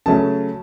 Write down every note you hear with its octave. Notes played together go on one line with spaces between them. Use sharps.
C#3 F#3 A3 C#4 A5